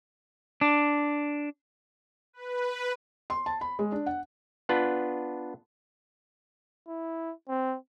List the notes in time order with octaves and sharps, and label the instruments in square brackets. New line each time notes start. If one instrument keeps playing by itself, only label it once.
[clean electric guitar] D4
[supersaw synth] B4
[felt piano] C6
A5
B5
G#3
D4
F#5
[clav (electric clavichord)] B3 D4 F4 B4
[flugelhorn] E4
C4